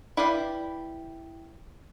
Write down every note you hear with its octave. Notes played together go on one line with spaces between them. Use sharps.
E4 G4 B4 D5 F5